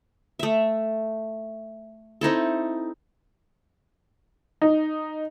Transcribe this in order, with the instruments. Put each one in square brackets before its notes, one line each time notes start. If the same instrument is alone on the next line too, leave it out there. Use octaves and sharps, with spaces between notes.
[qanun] A3 E5
C4 D#4 E4 A4
[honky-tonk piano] D#4